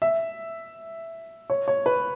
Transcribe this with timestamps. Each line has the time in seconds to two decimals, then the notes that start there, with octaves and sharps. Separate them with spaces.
0.02 E5
1.50 C#5
1.68 C#5
1.86 B4